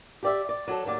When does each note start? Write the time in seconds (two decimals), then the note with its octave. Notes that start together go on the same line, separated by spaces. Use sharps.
0.23 G4 D5 E5
0.49 D5
0.67 F#3 A4
0.85 D#2 A2 F#3 D5